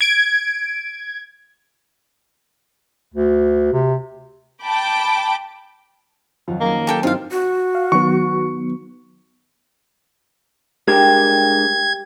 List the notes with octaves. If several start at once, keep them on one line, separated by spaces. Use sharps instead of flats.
G#6 D7
D2
C3
G5 A5 B5 D6
F2 D#3 F3 F#3
F#3 A#3 C#4 G#4
G4 A4 G5
G2 C4 D#4 F4 F#4 F5
F#4
F5
D#3 F#3 B3 C#6
G#3 D4 G4 A#4 G#6